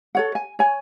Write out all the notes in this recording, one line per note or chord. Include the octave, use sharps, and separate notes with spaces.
A4 C#5 F#5
G#5
C#5 G#5